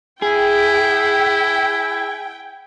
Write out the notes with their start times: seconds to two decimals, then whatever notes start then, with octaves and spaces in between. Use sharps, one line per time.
0.22 E4 G#4 G5